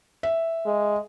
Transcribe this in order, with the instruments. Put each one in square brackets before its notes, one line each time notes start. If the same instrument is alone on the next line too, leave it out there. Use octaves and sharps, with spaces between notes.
[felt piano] E5
[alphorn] G#3